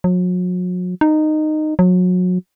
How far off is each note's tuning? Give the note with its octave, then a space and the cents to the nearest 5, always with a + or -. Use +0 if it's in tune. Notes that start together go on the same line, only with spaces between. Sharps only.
F#3 -40
D#4 -15
F#3 -30